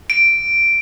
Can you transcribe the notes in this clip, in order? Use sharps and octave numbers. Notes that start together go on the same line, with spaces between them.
D7